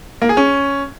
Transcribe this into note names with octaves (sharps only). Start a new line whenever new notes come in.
A#3
G#4
C#4